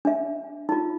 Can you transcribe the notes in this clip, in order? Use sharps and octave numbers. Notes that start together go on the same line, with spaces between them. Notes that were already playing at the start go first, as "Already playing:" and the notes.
D4 E5
D#4 F4